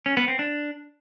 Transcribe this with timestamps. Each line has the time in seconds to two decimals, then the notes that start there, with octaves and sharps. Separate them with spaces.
0.06 C#4
0.17 B3
0.28 C4
0.39 D4